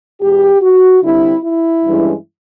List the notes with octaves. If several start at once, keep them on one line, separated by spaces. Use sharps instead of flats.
E2 B2 G#3 G4
F#4
D3 G3 C4 E4
E4
G2 E3 G#3 C#4